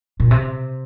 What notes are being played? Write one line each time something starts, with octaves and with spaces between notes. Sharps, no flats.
A#2
C3